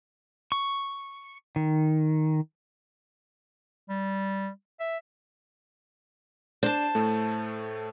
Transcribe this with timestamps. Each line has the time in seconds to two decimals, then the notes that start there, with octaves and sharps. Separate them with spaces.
0.52 C#6
1.56 D#3
3.89 G3
4.80 E5
6.63 D4 C5 A5
6.95 A2 A3